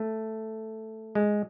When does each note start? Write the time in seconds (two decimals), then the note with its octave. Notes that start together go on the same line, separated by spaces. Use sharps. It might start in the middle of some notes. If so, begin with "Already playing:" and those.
Already playing: A3
1.15 G#3